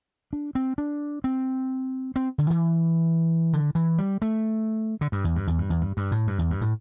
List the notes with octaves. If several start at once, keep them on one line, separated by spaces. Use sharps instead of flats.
D4
C4
D4
C4
C4
D3
E3
D3
E3
G3
A3
D3
G2
E2
G2
E2
G2
E2
G2
G2
A2
G2
E2
G2
A2